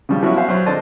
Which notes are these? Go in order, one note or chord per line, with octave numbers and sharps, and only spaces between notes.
C#3 F3 G3
F3 F#3 B3 C#4 E4 F#4
F#4 C5 E5 F5 G#5
F#3 C5
G#1 D4 A4 C5 D5 D#5